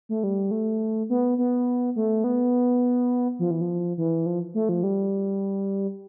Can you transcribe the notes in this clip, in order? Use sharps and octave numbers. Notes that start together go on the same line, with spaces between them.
A3
G3
A3
B3
B3
A3
B3
F3
E3
F3
E3
F3
A3
F3
G3